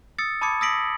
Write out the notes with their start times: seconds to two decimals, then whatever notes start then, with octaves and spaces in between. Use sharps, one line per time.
0.18 D#6 E6 A6 C#7
0.41 A5 B5 D6 D#6 G#6 C#7
0.61 D#6 E6 A#6 B6 D7 F#7